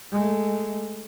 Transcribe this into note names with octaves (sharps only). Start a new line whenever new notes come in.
G#3 A3